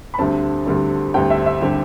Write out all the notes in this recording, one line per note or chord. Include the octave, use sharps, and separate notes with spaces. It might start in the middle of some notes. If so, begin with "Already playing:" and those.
B5
D2 D3 G3 C4 A5
D2 D3 G3 C4
D2 D3 G3 C4 G5
E5
E5
D3 G3 C4 G4